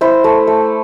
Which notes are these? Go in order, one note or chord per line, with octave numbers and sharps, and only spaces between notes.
E4 C5
A3
A3